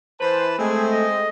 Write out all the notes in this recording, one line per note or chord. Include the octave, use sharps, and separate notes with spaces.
E3 B4 C5 A5
G#3 A3 C4 G#4
D#5